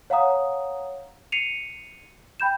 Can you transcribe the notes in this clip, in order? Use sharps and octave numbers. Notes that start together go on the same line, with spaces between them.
C#5 F5 F#5 A#5 D#6
C7 C#7 D#7 F7
G5 B5 G6 E7